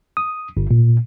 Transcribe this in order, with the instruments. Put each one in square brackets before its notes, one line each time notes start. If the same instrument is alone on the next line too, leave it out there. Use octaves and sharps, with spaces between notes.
[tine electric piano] D#6
G1
A#2